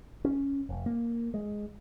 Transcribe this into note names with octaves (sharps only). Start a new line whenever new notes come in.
C#4
F1
A#3
G#3